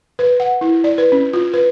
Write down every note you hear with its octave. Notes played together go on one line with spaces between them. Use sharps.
B4
F#5
E4
D5
B4
C#4
F4
B4